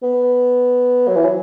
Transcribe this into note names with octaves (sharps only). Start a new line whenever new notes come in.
B3
F#3
E3
F#3